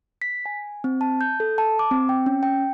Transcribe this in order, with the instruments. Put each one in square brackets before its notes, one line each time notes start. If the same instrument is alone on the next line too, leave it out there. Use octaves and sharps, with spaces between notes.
[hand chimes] B6
G#5
C4
A5
G6
A4
A5
D6
C4
G5
C#4
G5